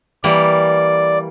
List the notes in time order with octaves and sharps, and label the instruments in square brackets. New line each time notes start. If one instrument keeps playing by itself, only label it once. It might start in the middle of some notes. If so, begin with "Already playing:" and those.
[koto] E3 G3 A#3 [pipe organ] D5